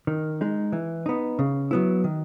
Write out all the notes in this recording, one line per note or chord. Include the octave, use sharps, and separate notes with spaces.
D#3
G#3 D#4
E3
B3 D#4
C#3
F#3 B3 E4
D#3